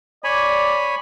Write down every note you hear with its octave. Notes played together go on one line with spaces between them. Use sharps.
C#5 D5 G#5 B5